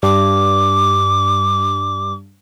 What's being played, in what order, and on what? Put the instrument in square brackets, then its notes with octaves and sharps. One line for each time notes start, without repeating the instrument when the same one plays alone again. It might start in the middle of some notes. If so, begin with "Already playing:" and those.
[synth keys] G2 [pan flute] D6